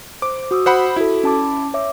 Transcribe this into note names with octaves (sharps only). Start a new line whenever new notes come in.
C5 D6
F#4 D#6 E6
C5 F#5 B5
E4 F#4 A4
C#4 A5 D6
C#5 E5 D6